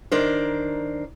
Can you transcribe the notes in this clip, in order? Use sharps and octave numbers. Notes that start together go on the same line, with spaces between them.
D#3 D4 A#4 C5